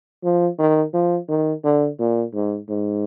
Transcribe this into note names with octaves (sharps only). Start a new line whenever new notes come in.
F3
D#3
F3
D#3
D3
A#2
G#2
G#2